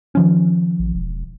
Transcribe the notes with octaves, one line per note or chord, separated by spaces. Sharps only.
D#3 F3 C#4
A1
E1